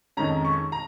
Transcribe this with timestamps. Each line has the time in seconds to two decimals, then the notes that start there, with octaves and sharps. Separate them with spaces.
0.17 F2 D#3 G#3 C#4 A#5
0.45 C#6
0.72 A#5